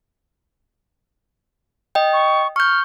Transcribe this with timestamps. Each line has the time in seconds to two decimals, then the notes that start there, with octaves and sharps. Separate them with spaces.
1.95 D#5 G5
2.13 C#6
2.56 C#6 F6 G6